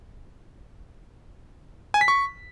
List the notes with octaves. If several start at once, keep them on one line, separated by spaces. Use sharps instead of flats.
G#5
B6
C#6